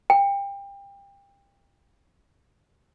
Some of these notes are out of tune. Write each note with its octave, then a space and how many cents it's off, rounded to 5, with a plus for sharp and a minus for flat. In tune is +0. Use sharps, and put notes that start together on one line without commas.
G5 +25